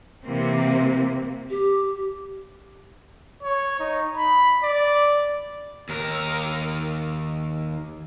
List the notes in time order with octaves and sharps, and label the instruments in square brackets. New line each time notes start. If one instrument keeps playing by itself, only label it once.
[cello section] C3 E3 A#3 C4
[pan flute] G4
[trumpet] C#5
D#4
B5
D5
[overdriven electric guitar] D#2 A#4